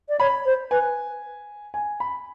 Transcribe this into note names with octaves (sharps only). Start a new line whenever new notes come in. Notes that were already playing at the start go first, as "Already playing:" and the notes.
D5
C#5 B5
C5
B4 G#5
G#5
B5